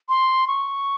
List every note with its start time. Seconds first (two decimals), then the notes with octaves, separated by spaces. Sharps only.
0.09 C6
0.48 C#6